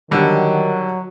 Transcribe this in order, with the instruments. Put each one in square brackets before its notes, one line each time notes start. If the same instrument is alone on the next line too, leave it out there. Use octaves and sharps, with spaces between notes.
[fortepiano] D3 G3 [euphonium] D#3 [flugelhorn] F#3